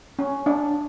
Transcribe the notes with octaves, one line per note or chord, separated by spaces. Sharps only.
C#4
D4